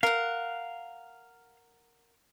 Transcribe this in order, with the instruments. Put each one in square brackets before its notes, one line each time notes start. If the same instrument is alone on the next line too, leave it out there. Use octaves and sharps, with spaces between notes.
[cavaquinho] A#4 F#5 [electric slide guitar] F5